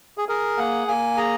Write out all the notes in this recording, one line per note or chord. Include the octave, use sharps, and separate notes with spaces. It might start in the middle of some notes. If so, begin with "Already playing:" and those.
G#4
G#4 A#4
A#3 F#5
A#3 G#5
G#4 A#5